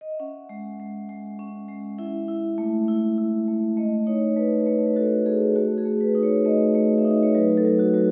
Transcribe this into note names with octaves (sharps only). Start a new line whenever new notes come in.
D#5
E5
C#4 F#5
G#3
G#3
G#3
C#4
G#3
E4 E5
E4
A3
E4
E4
A3
A3 D#5
D#4 C#5
C#5
A3 B4
B4
A3 C#5
B4
F#4 A4
A3 G#4
A3 F#4
G#4
A3
B4
D#4
C#5
A3 D#5
A3
E5
D#4
D#5
C#5
F#3 B4
A4
F#3
F#4
F#3